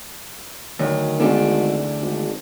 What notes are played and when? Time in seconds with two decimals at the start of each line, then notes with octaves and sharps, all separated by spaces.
0.79 D2 D#3 F#3
1.20 G#1 E2 D4 A4
2.02 G#1